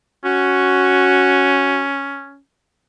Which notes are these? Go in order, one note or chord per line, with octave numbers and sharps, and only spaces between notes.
C#4 F#4